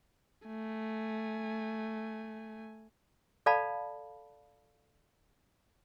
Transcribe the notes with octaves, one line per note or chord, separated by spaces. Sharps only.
A3 G#5
A4 D5 F5 A5 B5